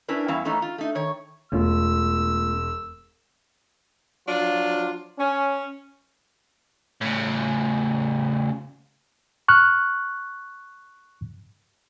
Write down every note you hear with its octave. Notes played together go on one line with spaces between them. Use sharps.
C#4 D4 E4 A#4 B4
E2 G3 C#4 E4 F5
E3 A3 A#3 C#4 D#4
F4
A3 D#4
D#3 C#5
E1 A3 C#4 F4 E6
F3 F#3 D4 F4
C#4
A2 C#3
C#6 F6 F#6